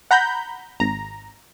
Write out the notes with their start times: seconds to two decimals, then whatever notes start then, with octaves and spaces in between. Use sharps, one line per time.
0.11 F#5 A#5 B5 G6
0.80 G#1 A#5